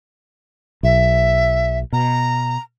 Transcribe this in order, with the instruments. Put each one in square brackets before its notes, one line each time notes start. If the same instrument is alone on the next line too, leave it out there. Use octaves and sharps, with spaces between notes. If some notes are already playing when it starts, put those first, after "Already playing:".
[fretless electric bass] B1 [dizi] E5
[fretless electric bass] B2 [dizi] A#5